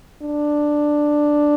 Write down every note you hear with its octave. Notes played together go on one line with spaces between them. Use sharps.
D4